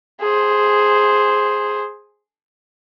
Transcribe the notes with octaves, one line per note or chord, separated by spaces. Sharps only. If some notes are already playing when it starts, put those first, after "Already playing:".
G#4 C5